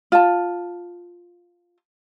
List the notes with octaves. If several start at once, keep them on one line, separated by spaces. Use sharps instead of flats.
F4 A5